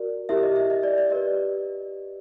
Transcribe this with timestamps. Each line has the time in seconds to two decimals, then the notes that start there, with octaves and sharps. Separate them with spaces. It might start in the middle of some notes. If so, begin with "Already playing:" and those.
Already playing: F#4 A#4 D5
0.29 E4 G4 A#4 E5
0.43 D#5
0.56 E5
0.70 D#5
0.83 D5
0.98 D5
1.10 G4 B4 D5 D#5